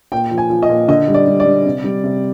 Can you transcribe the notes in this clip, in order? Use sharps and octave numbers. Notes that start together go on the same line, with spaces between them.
A#2 G5
F3
G#5
F3
D#5
A#2
D3 D#5
G3
D5
G3
D5
G3
C3
G3
C3